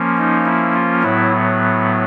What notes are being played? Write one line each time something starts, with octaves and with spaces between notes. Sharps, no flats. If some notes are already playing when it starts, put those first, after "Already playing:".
Already playing: F3 A#3 C#4
D#4
E4
F4
A2 F#3 B3 E4